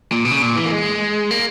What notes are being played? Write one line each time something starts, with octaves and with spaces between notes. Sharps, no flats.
A#2
B2
C#3
A#2
E3
A#3
G#3
A#3